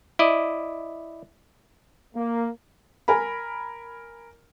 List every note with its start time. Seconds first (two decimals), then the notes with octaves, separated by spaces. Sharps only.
0.19 E4 D5 D#5
2.15 A#3
3.08 A#4 G#5 B5